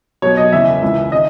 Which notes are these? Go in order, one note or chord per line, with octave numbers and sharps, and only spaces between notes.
B1 B2 F#3 C#5
D#5
E1 E2 C#3 E5
C#2 C#3 E3
D#3 D#5